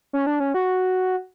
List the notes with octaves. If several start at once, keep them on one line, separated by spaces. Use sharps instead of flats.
C#4
D4
C#4
F#4